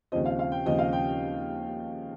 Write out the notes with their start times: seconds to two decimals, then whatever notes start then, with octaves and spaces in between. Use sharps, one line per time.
0.12 D#2 C#3 F3 C4 D#5
0.26 F5
0.39 F5
0.52 G5
0.66 D#2 C#3 F3 C4 D#5
0.79 F5
0.93 G5